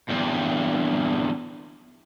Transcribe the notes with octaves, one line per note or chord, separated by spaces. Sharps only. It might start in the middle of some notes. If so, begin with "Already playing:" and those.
E2 G2